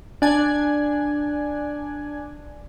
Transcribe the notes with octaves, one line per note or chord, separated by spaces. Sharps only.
D4 G#5